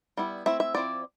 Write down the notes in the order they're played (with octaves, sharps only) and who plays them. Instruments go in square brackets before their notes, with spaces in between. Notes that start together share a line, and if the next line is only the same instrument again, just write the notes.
[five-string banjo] G3 B3 E4
A3 C4 E4 E5
E5
F3 C4 E4 D5